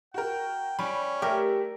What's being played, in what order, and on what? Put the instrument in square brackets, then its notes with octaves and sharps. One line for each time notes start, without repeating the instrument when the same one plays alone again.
[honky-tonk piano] F#4 A#4 [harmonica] G5
[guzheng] G3 [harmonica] C#4 [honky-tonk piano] B5 D7
[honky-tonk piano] A3 E5 [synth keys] G4 [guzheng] A#4